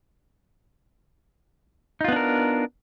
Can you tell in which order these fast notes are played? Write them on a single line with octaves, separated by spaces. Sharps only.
D#4 F4 B3 D4 A#4